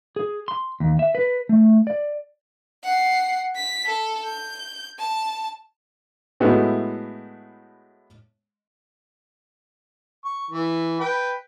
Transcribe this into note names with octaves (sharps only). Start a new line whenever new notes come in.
G#4
C6
D#2
E5
B4
A3
D5
F#5 C7
B6
A4
G6
A5
A2 G#3 A3 B3 E4 F#4
C#6
E3
B4 G5